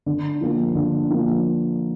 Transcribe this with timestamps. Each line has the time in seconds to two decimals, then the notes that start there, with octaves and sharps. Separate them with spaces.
0.06 D3
0.41 F3 A#3
0.75 D3
1.10 F3 A#3